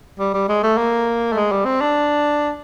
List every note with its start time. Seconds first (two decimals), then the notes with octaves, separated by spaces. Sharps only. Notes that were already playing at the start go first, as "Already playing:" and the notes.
0.19 G3
0.34 G3
0.49 G#3
0.63 A3
0.78 A#3
1.33 A3
1.36 G#3
1.52 G3
1.65 C4
1.81 D4